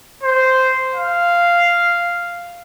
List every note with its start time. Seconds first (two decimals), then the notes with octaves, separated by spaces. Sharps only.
0.23 C5
0.95 F5